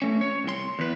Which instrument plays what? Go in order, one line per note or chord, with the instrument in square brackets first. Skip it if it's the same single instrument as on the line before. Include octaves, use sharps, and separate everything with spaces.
[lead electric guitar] A3 C#4
C#5
C2 C6
E2 B4